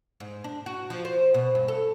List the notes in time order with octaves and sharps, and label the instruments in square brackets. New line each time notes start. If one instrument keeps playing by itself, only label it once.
[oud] G#2
D4
F#4
F3
C5
B2
G2
A4